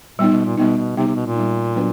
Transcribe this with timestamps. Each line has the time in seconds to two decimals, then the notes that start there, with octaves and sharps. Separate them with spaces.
0.19 A#2 G3 B3 D#4
0.32 B2
0.45 A#2
0.57 B2 G3 B3 D#4
0.77 B2
0.97 C3 G3 B3 D#4
1.07 C3
1.16 B2
1.27 A#2
1.36 G3 B3 D#4
1.75 F#3 B3 D4 F#4 B4